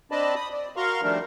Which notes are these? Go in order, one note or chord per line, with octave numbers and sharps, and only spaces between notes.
C4 D4 D5 D#5 A5 B5
B5 D#6
D5
F#4 A#4 F5 A#5 C6 C#6
D#3 F3 G3 A3 D4 A#4